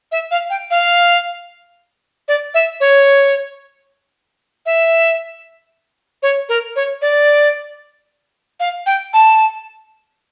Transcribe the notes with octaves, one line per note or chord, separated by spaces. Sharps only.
E5
F5
G5
F5
D5
E5
C#5
E5
C#5
A#4
C#5
D5
F5
G5
A5